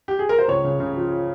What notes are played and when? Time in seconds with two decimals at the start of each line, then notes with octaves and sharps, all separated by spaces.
0.08 G4
0.19 G#4
0.29 A#4
0.38 C5
0.48 C#2 C#5
0.64 C#3
0.80 C#3
0.97 F3